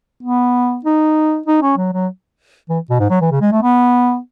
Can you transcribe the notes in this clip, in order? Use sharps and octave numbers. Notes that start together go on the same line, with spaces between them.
B3
D#4
D#4
C#4
F#3
F#3
E3
B2
G#2
F#3
E3
C#3
G#3
A3
B3